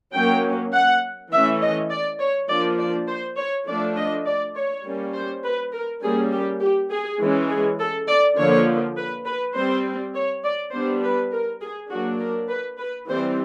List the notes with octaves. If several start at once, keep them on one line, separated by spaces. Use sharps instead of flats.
F#3 A#3 C#4 G5
F#5
E3 A3 C#4 E5
D#5
D5
C#5
F3 A#3 D4 D5
D5
C5
C#5
F3 A3 D4 D5
D#5
D5
C#5
G3 A#3 C#4
C5
B4
A#4
G3 A#3 C#4 G#4
G4
G4
G#4
E3 G#3 C#4
G#4
A4
D5
D3 F3 A#3 C#5
B4
B4
G3 C4 C5
C#5
D5
G3 B3 D4 C5
B4
A#4
G#4
F#3 A#3 D4 F#4
A#4
B4
B4
E3 G3 C4 C5